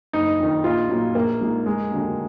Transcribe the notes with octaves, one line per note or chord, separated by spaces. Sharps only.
F#1 D#4
F2 D#3
A#1 F4
A#2 F#3 A#3
A#1 A#3
A#2 G#3 D#4 G#4
F1 G#3
D#2 D3 F#3 A#3